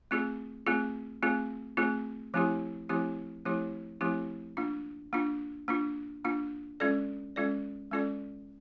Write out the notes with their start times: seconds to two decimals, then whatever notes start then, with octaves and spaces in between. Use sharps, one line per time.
0.11 A3 C4 F4 G#4
0.67 A3 C4 F4 G#4
1.23 A3 C4 F4 G#4
1.77 A3 C4 F4 G#4
2.34 F3 A3 C4 E4 G4
2.89 F3 A3 C4 E4 G4
3.45 F3 A3 C4 E4 G4
4.01 F3 A3 C4 E4 G4
4.57 A#3 D4 F4
5.13 A#3 D4 F4
5.68 A#3 D4 F4
6.24 A#3 D4 F4
6.80 G#3 C#4 F4 A4 D5
7.36 G#3 C#4 F4 A4 D5
7.91 G#3 C#4 F4 A4 D5